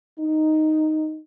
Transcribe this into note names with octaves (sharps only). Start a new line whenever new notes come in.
D#4